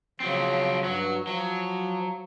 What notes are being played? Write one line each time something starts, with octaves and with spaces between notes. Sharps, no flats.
C#3 F3 F#3 C4
G2 F#3 F#4
F3 F#3